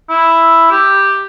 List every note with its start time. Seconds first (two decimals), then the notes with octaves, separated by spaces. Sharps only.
0.09 E4
0.71 G4